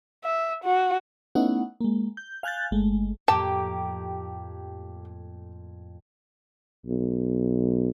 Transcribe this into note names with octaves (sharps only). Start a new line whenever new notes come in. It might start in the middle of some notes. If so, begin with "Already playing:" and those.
E5
F#4
A3 B3 C#4 D#4 E4 F#5
G#3 A#3
G6
F5 G#5 F#6 G6 A6
G1 G#3 A3
F2 A2 A#3 G4 A5
B1